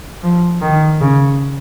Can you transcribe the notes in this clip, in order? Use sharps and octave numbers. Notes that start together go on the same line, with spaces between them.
F3
D#3
C#3